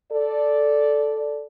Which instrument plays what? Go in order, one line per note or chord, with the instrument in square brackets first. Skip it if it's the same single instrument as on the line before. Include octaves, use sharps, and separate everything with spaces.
[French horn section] A4 D5